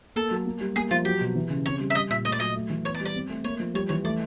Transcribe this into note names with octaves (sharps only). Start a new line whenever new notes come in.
A#3 A4
F#3
A#3
G3
A#3 G#4
F3 F4
F#3 G4
B2
E3
C#3
C4 C#5
G3
E5
G3 D#5
A#2 E5
A3 D#5
D5
F#3 D#5
A3
E3
B3 C#5
D5
G3
D5
C4
A3
A#3 C#5
F3
G3 C#5
E3 C#5
A3 D5